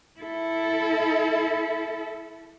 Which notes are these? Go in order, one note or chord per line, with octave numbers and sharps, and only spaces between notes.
E4 A4